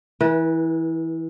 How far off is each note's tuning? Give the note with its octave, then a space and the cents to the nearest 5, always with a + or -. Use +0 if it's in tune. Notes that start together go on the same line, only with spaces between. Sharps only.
E3 -15 B4 -40